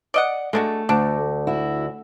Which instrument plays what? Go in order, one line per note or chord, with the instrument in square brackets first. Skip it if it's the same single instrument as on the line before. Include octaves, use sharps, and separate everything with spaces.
[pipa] D5 D#5 F#5
[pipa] G#3 D4 F#4 [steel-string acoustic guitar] A3
[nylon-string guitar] D2 [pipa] D4
[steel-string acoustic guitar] E4 F#4